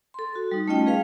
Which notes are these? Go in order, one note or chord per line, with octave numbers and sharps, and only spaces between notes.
A4 C6
F#4
G3 D#4
A3 C#4 F4 D#5 G5
G#4 B4 F5